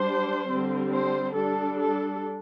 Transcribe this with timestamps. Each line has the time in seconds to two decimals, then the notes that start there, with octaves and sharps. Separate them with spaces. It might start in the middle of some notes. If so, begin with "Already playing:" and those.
Already playing: G3 D4 C5
0.48 D3 G3 C4
0.92 C5
1.35 G3 D4 A4
1.79 A4